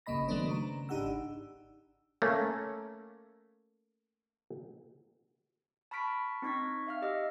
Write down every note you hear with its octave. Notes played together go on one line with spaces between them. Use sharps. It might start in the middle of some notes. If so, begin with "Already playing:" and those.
G1 C#3 A#3 D#5 B5 A#6
D#3 F#3 A3 B3 D4 C5
C#3 A#5
G#1 D4 D#4 G4 F#5 E6
A3 A#3 C#4
A5 B5 C#6 F6 B6 D7
C4 D#4 C#6 G#6 A#6 B6
E5 F5 F6
G4 D#5 E6